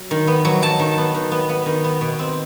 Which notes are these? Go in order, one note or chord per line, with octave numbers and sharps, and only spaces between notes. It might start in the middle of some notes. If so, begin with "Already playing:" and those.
Already playing: F#3
D#3
B3
F#3
F#3 A5
D#3
B3
D#3
B3
B3
D#3
B3
B2
C4